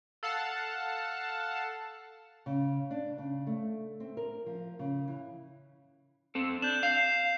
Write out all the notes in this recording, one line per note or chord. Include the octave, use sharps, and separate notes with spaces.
A4 F5 F#5 A5
C#3
D4
C#3
A3
C4
A#4
F3
C#3
E3
C4 A4
D4 G6 E7
F5 G6 C7